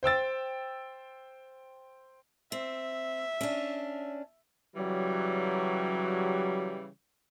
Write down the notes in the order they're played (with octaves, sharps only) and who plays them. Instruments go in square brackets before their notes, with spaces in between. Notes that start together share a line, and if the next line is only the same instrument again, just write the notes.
[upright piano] C5 G5 E6 A6
[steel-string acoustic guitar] C4 [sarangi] E5
[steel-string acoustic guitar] C#4 D4
[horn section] C#3 E3 G3 [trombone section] F#3